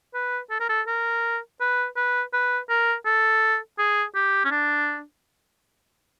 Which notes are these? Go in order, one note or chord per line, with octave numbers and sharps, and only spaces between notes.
B4
A4
A#4
A4
A#4
B4
B4
B4
A#4
A4
G#4
G4
C#4
D4